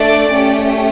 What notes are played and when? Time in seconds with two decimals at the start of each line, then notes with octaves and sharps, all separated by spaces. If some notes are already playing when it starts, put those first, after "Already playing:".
Already playing: A3 D4 A4 D5
0.33 A3 C#4 G4